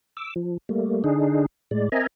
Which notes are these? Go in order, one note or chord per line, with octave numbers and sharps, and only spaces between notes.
D6 E6
F3
G3 A3 A#3
D3 D4 D#4 G#4
A2 G#3 D5
C4 A#4 D#5 E5 G#5 A#5